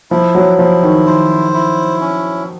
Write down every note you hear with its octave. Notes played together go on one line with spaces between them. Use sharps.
F3 E4
F#3
F3 E4
D#3
D#3 C5
E4
C#4